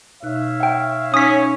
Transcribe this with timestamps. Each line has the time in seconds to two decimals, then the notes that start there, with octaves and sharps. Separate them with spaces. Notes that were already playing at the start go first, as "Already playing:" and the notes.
0.23 B2 D#4 C#5 E5 F5 F#6
0.60 F#5 G5
1.14 C#4 D#4 D#6 B6